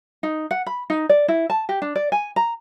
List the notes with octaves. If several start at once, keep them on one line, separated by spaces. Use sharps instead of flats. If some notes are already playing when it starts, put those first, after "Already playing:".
D#4
F#5
B5
D#4
D5
E4
A5
G4
D4
D5
G#5
A#5